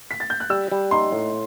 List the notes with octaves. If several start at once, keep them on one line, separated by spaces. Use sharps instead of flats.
B6
A6
G6
F#6
G3 E6
G3
D#4 C6
A2